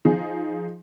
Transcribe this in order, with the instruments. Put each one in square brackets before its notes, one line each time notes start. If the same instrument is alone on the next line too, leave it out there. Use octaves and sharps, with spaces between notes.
[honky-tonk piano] F3 D#4 G#4